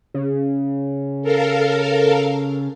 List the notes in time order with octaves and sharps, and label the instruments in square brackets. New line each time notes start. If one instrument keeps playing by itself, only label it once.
[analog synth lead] C#3
[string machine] A4 A#4 F5